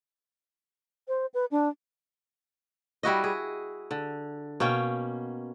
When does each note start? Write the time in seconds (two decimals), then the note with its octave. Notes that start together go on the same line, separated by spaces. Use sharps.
1.08 C5
1.34 B4
1.51 D4
3.03 G3 E4 F#4 D#5
3.24 G#4
3.91 D3
4.60 B2 A#3 C#4 G5